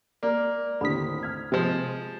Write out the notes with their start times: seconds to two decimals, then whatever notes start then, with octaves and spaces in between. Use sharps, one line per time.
0.23 A#3 D5
0.81 D#2 A2 D3 C4 B5 D#6 B6
1.23 F6 G#6
1.52 C3 F3 G#3